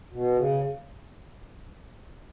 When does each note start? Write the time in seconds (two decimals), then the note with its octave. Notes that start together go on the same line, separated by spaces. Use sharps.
0.13 B2
0.36 C#3